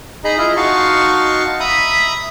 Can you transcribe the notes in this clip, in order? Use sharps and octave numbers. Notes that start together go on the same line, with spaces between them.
D#4 G#4 D#5 A#5 B5
E4 F4 G#4 D#5 A#5
D#4 F#4 F5 A5 C6 C#6
E5 A#5 B5 D#6